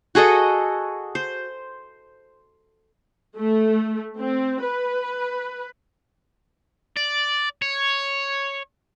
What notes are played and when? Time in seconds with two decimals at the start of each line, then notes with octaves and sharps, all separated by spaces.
0.15 F#4 G#4 A4 D#5
1.15 C5
3.37 A3
4.18 C4
4.64 B4
6.96 D5
7.62 C#5